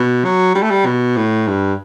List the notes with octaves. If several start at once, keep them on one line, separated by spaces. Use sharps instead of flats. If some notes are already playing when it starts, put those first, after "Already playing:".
Already playing: B2
F#3
G3
A3
G3
B2
A2
G2